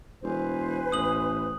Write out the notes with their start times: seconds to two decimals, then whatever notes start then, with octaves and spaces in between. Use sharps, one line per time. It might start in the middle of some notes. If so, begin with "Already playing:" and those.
0.23 E1 B4 C5 G#5
0.92 A1 D#6 F#7